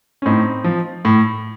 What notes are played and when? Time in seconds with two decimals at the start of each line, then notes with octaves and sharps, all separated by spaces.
0.22 C#4
0.25 A2 C4 D#4
0.64 F3
1.05 A2